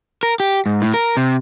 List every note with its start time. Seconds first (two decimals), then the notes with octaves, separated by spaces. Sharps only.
0.23 A#4
0.40 G4
0.66 G#2
0.82 A2
0.94 A#4
1.17 C3